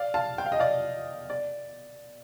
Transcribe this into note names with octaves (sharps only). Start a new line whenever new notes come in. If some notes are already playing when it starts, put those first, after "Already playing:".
Already playing: D5 F5
F5 A5
G5
F5
D#5
D5 F5
D5